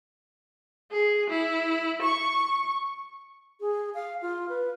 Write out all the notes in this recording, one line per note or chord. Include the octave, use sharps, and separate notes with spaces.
G#4
E4
C#6
G#4
F5
F4
B4